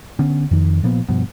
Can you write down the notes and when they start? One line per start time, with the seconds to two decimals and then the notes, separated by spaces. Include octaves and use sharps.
0.19 D3 B3 C#4
0.51 F2 D#3
0.83 A#2 F3 A#3 B3
1.09 G2 B2 F3 B3